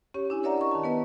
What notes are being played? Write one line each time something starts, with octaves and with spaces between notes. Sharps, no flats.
C#4 G4 C#5
D4 E4 G#5
A#4 C#5 D5 E5 F#5 A#5
D#5 C#6
D#3 A5
B3 B4 D#5